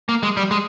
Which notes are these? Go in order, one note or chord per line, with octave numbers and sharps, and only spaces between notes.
A#3
G#3
G3
G#3